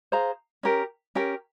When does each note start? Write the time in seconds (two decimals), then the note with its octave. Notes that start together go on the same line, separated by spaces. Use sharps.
0.12 G#4 C5 F5 A#5
0.63 C#4 G4 A#4
1.15 C#4 G4 A#4